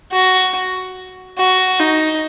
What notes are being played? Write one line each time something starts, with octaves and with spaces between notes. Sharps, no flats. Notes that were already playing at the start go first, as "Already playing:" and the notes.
F#4
F#4
D#4